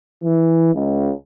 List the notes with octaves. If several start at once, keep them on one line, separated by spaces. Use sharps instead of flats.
E3
C#2